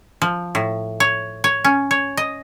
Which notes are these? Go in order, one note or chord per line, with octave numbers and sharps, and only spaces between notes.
F3
A2
C#5
C#5
C#4
C#5
D#5